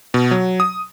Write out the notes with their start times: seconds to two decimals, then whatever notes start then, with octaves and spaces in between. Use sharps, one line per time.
0.14 B2
0.31 F#3
0.60 D#6